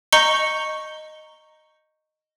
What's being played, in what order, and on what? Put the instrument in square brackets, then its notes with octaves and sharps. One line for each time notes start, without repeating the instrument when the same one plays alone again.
[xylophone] D#5 A#5 C#6 G6 C#7 G7